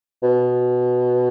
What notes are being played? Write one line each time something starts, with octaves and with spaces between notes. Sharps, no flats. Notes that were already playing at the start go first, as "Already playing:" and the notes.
B2